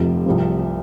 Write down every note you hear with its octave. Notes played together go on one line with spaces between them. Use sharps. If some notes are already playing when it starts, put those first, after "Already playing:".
Already playing: F1 F2 C3 F3
C2 C3 F3